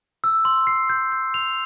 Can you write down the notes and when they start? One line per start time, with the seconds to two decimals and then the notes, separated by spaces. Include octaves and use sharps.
0.24 E6
0.45 C6
0.67 C7
0.89 G6
1.12 G6
1.34 F7